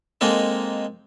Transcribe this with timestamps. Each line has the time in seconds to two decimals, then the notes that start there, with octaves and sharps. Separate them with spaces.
0.21 G#3 A#3 C4 D#4 A4